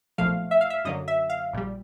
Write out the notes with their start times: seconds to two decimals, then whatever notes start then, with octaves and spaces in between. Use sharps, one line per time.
0.18 B1 A#2 F3 A3 F5
0.51 E5
0.61 F5
0.70 E5
0.85 F#2 D3 F#3 A#3 D#5
1.08 E5
1.30 F5
1.53 A#1 A#2 G3